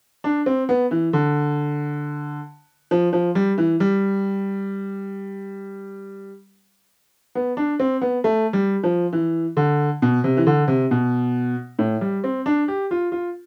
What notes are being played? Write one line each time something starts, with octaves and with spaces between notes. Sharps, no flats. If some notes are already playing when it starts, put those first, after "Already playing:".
D4
C4
B3
E3
D3
F3
F3
G3
E3
G3
B3
D4
C4
B3
A3
G3
F3
E3
D3
B2
C3
E3
D3
C3
B2
A2
G3
C4
D4
G4
F4
F4